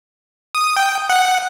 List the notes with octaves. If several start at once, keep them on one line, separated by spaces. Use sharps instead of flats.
D#6
G5
F#5